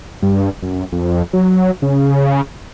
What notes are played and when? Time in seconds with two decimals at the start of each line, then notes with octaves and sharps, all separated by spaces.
0.22 G2
0.62 F#2
0.92 F2
1.33 F#3
1.82 C#3